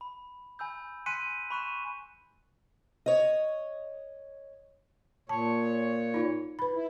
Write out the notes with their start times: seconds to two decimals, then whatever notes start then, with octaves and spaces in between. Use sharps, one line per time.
0.01 B5
0.59 G#5 B5 E6 G6
1.06 G#5 C6 F#6 B6 C#7 D#7
1.51 B5 C#6 F#6 D#7 E7
3.06 C#5 D#5
5.29 A#2 C#5 A5
6.14 D#4 F4
6.59 B4 B5
6.74 E4